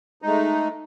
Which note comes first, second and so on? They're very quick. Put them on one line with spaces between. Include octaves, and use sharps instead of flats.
D#4 G#3 A3